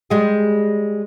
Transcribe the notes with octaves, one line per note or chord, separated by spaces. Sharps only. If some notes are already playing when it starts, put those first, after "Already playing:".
G3 G#3 G#4